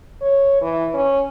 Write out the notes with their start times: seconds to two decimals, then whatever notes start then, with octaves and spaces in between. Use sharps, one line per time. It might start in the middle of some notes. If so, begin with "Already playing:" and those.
0.21 C#5
0.62 E3
0.94 C#4